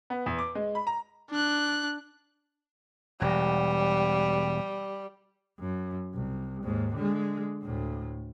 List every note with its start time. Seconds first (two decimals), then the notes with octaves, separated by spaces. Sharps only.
0.10 B3
0.26 E2
0.39 D6
0.55 G#3
0.75 B5
0.87 A#5
1.30 D4 F#6
3.21 E1 G3
5.60 F#2
6.14 C2
6.63 D#2 G#2
6.95 D3 G#3
7.62 D2 A2